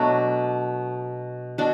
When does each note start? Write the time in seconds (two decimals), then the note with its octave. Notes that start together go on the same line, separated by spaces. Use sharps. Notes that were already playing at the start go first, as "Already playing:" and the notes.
Already playing: B2 F#3 A3 D4 F#4
1.58 B2 D4 F#4